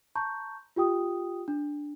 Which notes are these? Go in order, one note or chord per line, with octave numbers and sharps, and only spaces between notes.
A5 A#5 C6 C#6 G6
F4 G4 G5 D#6
D4